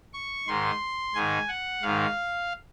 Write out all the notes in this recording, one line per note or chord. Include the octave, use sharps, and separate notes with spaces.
C#6
G#2 D#3 C6
G#2 D#3 G#5
F#5
G#2 D#3 F5